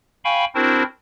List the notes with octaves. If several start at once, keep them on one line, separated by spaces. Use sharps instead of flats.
F5 G5 G#5 B5 C#6
C4 D4 E4 F#4 A#4 C5